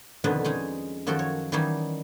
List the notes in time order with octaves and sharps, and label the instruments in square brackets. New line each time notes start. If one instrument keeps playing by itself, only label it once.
[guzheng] F2 B2 D3 D#3 D#4 B4
G#3 C#4 D#4 G#4
F#2 D#3 F3 F#4 A4 G5
C#5
D#3 E3 F#3 G3 C#4 D#4